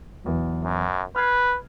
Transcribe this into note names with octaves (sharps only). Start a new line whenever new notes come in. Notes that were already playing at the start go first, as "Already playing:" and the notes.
B1 E2 E3
F#2
B4 F6 G#6 C7